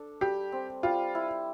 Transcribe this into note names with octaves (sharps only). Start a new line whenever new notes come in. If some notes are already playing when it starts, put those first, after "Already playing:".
Already playing: D4 A4
G3 G4
C4
G3 F4
E4